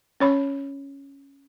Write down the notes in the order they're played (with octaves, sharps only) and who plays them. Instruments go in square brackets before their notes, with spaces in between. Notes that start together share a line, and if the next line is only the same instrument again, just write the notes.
[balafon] C#4 C#5 B5